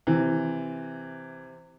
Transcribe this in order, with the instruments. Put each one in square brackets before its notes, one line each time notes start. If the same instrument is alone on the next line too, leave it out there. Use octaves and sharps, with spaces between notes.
[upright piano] C3 E3